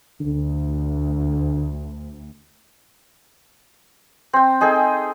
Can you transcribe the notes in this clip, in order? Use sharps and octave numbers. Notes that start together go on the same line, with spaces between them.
D2 D3
C4 G5
D#4 G#4 A4 G5